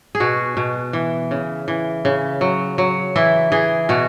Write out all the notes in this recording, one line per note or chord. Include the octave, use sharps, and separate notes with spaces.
G#4
B2 F#4
B2
E3
C#3
E3
C#3
F#3
F#3
E3 E4
E3 G#4
B2 F#4